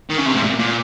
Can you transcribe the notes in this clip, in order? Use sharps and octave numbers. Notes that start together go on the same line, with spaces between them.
D#3
C#3
C3
G#2
A#2
A#2